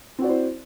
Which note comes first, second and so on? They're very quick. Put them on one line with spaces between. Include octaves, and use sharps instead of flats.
C4 F#4 D5 E4 C5